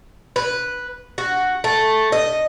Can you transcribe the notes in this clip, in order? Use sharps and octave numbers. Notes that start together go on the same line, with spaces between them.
B4
F#4
A3
D#5